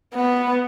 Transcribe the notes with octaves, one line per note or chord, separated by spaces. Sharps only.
B3